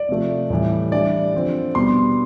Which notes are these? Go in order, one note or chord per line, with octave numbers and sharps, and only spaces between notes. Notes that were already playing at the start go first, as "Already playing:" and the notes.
Already playing: D5
C3 F3 A3
A2 E3 G3
E3 G3 D4 D5
D3 F3 C4
B2 G3 B3 D4 C6